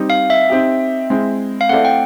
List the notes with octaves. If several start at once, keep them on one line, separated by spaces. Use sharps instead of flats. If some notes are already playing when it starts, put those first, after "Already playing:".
Already playing: G3 C4 D#4
F5
E5
C4 D#4 G4
G#3 C4 E4
F5
A3 C4 E4 A4 D5 F#5
G5